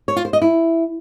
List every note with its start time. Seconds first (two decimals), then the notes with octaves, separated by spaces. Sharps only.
0.08 C#5
0.16 F4
0.25 C5
0.33 D#5
0.42 E4